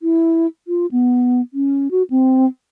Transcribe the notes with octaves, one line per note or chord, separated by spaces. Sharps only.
E4
F4
B3
C#4
F#4
C4